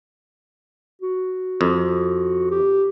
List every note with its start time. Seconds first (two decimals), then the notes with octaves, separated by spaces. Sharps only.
1.02 F#4
1.61 F2
2.51 G4